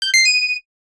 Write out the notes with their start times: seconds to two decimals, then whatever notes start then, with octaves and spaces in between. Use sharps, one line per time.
0.02 G6
0.14 C7
0.25 D#7